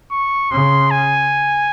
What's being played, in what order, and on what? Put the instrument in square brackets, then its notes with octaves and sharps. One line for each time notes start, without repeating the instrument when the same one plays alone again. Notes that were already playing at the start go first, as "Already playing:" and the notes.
[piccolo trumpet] C#6
[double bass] C#3 [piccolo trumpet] C6
[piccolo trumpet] G#5